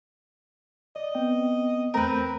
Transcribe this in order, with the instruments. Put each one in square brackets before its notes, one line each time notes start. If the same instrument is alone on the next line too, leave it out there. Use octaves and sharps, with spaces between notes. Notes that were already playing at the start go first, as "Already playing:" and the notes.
[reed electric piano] D5 [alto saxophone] D#5
[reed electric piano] B3 C4 G5
[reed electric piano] E2 A3 G5 [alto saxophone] C4 [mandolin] A#4 B4